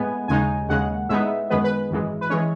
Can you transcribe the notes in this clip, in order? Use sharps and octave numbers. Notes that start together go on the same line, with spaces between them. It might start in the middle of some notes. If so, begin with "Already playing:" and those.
Already playing: A2 G#3 B3 G#5
D#2 C#3 G#3 D#4 G#5
D#2 C#3 G#3 F#5
A2 G#3 B3 D#4 E5
F#2 D#3 G#3 B3 B4
B4
G#1 F#2 E3 G#3
B4
E3 G#3 C#4 C#5